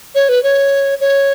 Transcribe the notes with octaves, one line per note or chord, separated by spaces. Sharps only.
C#5
B4
C#5
C#5